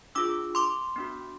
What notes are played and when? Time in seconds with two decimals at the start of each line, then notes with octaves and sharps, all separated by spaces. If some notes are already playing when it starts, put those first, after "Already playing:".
0.15 D4 F4 G#4 D6 E6
0.55 C6 D6
0.96 B3 D4 F#4